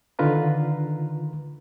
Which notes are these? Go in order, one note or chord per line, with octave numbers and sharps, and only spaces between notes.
D3 D#3 F4 B4 A#5